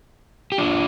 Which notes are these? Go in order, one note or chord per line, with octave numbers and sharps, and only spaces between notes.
G4
E2 E3 D4 F4